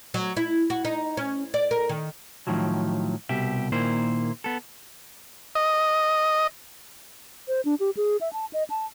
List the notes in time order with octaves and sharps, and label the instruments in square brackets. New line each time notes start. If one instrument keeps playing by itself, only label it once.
[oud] F#3
E4
F#4
D#4
C#4
D5
A#4
D#3
[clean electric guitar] A2 D#3 F3 F#3
C2 B2 G4 E5
A#2 D#3 A#3 E4 C5
B3 A4
[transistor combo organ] D#5
[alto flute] C5
D4
G4
G#4
E5
A5
D#5
A5